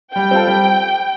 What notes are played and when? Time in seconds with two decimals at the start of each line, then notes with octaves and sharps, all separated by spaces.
0.15 G3 G5
0.31 C4 F4 A4
0.47 G3